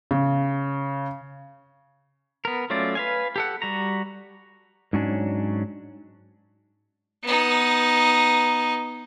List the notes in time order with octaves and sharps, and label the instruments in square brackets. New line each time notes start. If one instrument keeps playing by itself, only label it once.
[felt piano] C#3
[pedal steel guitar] B3 A#4
F#3 A3 C#4 F4 D5
B4 F5 G#5
G4 A4 F#5
G3 F#4 A#5
[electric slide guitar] G#2 F#3 C#4 D4
[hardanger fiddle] B3 D#4